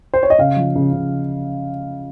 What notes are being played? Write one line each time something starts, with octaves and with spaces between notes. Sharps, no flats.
C5
C#5
D#5
C#3 F5
F3
C#3
C#3